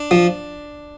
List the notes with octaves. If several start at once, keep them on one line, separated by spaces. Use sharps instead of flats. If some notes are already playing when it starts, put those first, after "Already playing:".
Already playing: D4
F3